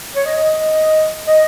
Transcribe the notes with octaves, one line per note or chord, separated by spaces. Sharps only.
C#5
D#5
D#5
D#5